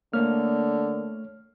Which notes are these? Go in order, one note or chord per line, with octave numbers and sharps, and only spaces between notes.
D3 A3 A#3 C#5 F6